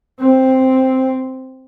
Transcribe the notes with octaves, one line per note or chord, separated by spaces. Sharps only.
C4